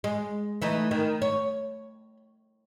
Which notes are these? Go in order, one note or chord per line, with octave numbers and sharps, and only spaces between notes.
G#3
E3 A3 D#4
D#3
C#5